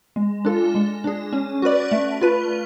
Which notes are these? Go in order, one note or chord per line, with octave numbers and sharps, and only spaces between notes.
G#3
D4 F4 A4
G#3
D4 G#4
C#4
F#4 B4 D5
A3
F4 B4